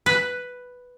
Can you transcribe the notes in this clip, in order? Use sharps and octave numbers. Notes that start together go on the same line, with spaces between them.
B4